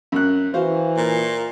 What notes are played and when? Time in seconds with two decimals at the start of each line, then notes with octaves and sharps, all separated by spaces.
0.12 F#2 F#6
0.54 E3 F#4 C5 F5
0.97 A#2